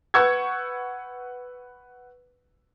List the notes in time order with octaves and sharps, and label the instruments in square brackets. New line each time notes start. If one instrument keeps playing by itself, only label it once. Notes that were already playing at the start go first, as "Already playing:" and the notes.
[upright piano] B4 F#5 C#6 E6 G6 G#6